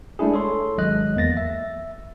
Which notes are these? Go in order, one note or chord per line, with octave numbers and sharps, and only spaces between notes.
G#3 A3 D4 E4 G#4
A4 C#5 C6
G#1 F#3 G#3 D#5 F#6
E2 A#3 A6 A#6
E5